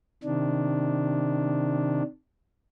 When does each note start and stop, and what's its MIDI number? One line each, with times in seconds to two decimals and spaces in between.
0.24 2.02 48
0.24 2.02 51
0.24 2.02 62